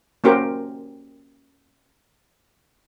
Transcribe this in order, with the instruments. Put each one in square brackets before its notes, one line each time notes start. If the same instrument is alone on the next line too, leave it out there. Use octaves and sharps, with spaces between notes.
[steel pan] A#3 C#4 F#4 G4 A#4 C5